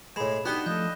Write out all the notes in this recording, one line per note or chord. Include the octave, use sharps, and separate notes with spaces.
A2 G#3 B5 E7
B3 D4 D#4 F#4 G4 F#6 G7
F3 A3 A4 D#5 G6